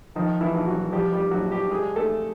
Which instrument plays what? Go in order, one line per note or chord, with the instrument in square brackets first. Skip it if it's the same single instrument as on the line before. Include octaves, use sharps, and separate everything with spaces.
[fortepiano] D#3 F3 D#4
E3 E4
A#1
F#3 F#4
F3 G3 G4
G3 G4
A#1 F#3 F#4
G3 G4
G3 G#3 G#4
A3 A4